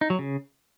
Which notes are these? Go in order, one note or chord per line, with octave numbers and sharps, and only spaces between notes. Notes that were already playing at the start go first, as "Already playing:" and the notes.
D#4
F#3
C#3